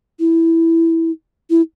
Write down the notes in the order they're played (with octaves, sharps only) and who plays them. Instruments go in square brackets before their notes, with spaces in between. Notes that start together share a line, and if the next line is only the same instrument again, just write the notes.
[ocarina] E4
E4